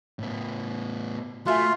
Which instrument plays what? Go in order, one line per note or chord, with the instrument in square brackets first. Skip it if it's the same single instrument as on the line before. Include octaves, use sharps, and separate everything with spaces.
[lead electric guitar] A2 B3
[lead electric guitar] A3 [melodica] F4 [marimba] F#4 E5 G#5